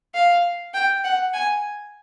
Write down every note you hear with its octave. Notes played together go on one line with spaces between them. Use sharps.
F5
G5
F#5
G#5